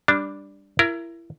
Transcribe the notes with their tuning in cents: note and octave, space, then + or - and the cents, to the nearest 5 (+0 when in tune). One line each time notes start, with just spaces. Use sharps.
G3 +15 D4 +0
E4 +25 A#4 +0